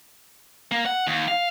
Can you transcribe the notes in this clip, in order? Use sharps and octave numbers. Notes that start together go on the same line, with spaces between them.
A#3
F#5
D#2
F5